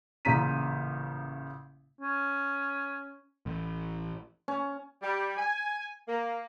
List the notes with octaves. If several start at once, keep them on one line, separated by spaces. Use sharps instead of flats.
A1 A#2 C#3 A#5 B6 D#7
C#4
A1
C#4
G3
G#5
A#3